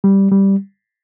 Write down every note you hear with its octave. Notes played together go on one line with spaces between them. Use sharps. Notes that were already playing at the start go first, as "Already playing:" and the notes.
G3
G3